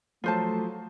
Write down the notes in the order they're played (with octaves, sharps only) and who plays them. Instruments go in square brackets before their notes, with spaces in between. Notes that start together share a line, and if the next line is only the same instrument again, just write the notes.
[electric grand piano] F3 F#3 [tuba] A3 [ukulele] F4 C5 A5